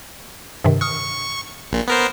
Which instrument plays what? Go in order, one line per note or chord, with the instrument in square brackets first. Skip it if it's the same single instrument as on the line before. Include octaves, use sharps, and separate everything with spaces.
[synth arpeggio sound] G2 C3 D#3
[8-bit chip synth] C#6 [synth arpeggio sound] D#6 F6
[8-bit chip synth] A#1 A#2
B3 A#4 C5